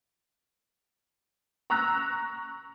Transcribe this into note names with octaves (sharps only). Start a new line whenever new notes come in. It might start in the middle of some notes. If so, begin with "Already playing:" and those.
A#5 C#6 E6 F#6 A#6 F7